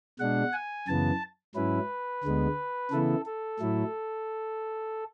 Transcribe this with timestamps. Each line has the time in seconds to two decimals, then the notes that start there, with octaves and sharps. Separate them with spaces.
0.19 B2 G#3 D4 F#5
0.53 G#5
0.87 F#2 C#3 E3 B3 A5
1.55 G#2 F#3 C#4 E4 B4
2.24 D2 D3 G#3 B3
2.91 C#3 E3 B3 E4 A4
3.25 A4
3.60 A2 F#3 A3 E4